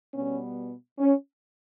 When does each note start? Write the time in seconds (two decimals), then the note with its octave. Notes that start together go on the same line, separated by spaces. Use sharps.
0.13 B2 G3 B3 C#4
0.99 C#4